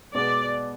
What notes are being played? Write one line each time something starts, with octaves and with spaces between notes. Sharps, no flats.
B2 G#3 B3 D5